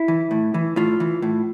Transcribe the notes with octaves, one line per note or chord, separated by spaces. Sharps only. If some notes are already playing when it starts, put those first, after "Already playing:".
Already playing: E4
E3
A2
E3
A2 F4
E3
A2